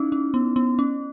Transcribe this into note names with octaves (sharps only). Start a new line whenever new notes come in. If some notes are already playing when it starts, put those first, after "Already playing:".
Already playing: C#4 D#4 E4
C#4
B3
B3
C#4